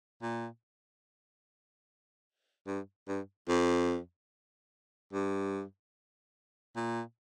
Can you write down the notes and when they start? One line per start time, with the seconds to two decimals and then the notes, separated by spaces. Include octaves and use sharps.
0.22 A#2
2.67 G2
3.08 G2
3.49 F2
5.13 G2
6.76 A#2